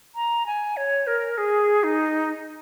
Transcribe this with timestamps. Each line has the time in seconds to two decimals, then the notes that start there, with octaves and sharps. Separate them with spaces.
0.15 A#5
0.46 G#5
0.77 C#5
1.07 A#4
1.38 G#4
1.84 D#4